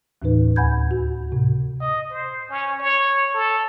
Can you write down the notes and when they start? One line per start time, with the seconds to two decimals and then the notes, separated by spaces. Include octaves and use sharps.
0.22 D#2 A2 E3 D#4 B4
0.56 D2 F#5 G#5 B5 G6 G#6
0.91 F#4
1.32 A2 C3
1.81 D#5
2.10 C5
2.50 C#4
2.79 C#5
3.34 A4